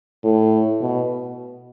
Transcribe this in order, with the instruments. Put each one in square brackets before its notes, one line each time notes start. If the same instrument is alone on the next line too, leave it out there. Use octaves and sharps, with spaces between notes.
[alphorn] A2
B2